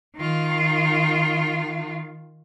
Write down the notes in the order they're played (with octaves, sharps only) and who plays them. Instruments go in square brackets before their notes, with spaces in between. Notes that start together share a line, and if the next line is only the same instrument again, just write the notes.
[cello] D#3 F4